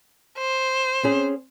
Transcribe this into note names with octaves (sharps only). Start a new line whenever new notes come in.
C5
C4 C#4 G#4